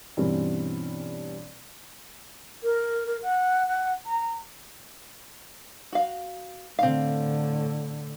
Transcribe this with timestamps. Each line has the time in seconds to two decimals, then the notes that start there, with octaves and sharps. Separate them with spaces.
0.17 G2 B2 E3 G3 C4 C#4
2.63 A#4
3.07 A#4
3.23 F#5
3.67 F#5
4.06 A#5
5.92 F#4 F5
6.79 A2 D3 C4 F5